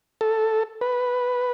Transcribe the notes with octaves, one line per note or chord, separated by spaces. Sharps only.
A4
B4